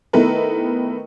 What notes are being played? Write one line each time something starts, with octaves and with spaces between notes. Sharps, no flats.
D#3 A3 B3 E4 A#4 B4